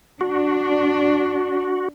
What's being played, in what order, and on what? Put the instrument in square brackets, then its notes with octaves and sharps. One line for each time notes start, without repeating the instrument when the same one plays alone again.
[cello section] D4 [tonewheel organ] F#4